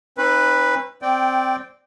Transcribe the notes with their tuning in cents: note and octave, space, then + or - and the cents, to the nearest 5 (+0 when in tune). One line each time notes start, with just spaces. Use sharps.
C4 +45 D#4 +0 B4 +0
C4 +0 D5 +0 G5 -15